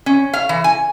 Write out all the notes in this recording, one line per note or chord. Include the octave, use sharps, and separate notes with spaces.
C#4
F5
E3
G#5